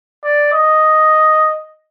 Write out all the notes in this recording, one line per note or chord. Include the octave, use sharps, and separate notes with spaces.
D5
D#5